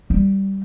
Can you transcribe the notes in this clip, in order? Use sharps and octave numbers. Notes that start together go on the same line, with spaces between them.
G3